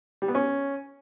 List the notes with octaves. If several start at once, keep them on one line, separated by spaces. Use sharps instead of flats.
G3
B3
C#4